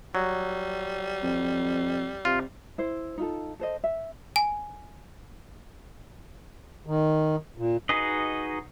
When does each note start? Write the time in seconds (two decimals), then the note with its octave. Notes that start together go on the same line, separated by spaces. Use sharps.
0.15 F#3 G3
1.23 F2
2.25 C3 F4
2.78 E4 C5
3.18 D#4 F4 A4
3.59 A4 C5 D#5
3.84 E5
4.36 G#5
6.87 D#3
7.57 A#2
7.89 D#4 F#4 G#4 B4 D#5